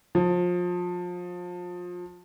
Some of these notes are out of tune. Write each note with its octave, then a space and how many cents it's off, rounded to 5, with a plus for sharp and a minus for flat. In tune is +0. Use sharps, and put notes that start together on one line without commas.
F3 +30